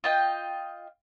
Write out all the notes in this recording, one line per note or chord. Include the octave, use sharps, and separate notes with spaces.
F4 D#5 G5